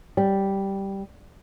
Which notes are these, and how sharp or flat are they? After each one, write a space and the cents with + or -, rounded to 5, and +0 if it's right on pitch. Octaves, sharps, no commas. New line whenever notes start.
G3 -5